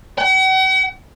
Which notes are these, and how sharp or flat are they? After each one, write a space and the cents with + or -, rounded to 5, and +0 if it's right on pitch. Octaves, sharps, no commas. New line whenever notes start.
F#5 +45